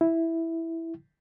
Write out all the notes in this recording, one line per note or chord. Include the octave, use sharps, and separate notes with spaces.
E4